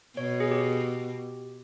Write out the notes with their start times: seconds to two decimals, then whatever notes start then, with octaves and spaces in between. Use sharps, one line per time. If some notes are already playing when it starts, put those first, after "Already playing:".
0.17 B2 C#5
0.40 G#4
0.51 G4